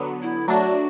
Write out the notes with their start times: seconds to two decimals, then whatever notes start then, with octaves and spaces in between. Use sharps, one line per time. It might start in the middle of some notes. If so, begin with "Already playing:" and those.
Already playing: D3 F#3 B3
0.22 E4
0.48 F#3 A3 D4 F#4